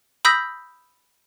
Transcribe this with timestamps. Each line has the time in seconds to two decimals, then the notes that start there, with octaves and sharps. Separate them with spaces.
0.25 B5 D#6 E6 G6 A#6 B6